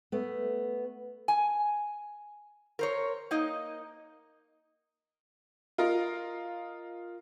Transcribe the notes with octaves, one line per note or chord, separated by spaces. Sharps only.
A3 B3
G#5
A#4 C5 C#5
A#3 D#4 D#5
F4 A#4 D#5